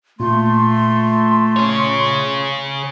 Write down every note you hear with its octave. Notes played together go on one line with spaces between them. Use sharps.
A#2 A3 F4 C6
G#4 C#5